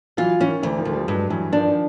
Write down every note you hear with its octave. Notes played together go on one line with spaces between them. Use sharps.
E3 F#3 F4
E3 C#4
D#3
D2 E3
D#3 F3
D2
F3 G3
G2 F#3 G#3
G2 E3 F#3
D#3 F3 D4
D#3 F3